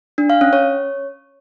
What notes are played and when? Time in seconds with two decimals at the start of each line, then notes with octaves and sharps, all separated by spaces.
0.18 D4
0.30 F5
0.41 C#4
0.53 C#5